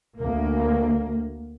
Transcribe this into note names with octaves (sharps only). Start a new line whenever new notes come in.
D2 A#3